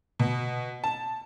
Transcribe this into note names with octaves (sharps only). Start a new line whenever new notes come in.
B2
A5